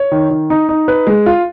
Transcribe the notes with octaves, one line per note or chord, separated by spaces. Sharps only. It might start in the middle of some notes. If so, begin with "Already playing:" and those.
Already playing: C#5
D#3
D#3
D#4
D#4
B4
G#3
F4